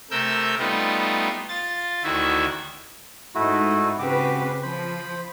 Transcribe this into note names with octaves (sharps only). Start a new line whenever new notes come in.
C3 A3 A#4 E6 G6
G3 A3 B3 D#4 F4
F4 A6
D2 D#3 E4 F#4 E5
G#2 A3 D#4 E4 F#4
C#3 C4 F#4 G4 B4 D6
F3 C5 B5